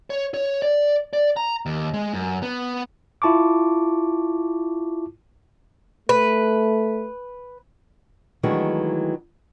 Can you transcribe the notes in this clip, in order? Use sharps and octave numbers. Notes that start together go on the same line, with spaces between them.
C#5
C#5
D5
D5
A#5
D#2
G#3
F#2
B3
E4 F4 A5 C#6 D6
A3 B4
D#3 E3 F#3 G#3 A3 D4